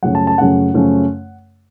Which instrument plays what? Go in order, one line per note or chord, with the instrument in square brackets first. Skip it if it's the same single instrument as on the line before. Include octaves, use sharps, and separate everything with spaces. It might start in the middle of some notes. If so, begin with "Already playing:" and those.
[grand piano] F#2 C#3 F3 A3 C#4 F#5
A5
A5
F#2 C#3 F3 A3 C#4 F#5
F#2 C#3 F3 A3 C#4